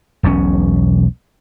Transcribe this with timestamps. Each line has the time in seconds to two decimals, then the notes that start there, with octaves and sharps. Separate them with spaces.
0.23 E1 B1 C3 C#4